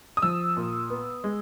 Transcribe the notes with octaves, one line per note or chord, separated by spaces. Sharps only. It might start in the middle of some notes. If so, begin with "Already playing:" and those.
D#6
F3 E6
A#2
B3
G#3